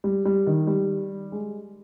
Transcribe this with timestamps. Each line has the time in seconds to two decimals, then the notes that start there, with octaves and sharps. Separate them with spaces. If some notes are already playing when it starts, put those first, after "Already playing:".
0.04 G3
0.25 G3
0.47 D#3
0.67 G3
1.32 G#3